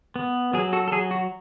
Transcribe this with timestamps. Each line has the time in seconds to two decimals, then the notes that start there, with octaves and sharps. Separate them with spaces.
0.16 B3
0.53 F#3 G#4
0.73 F#4 A4
0.88 A4
0.92 F#3 G#4
1.11 F#4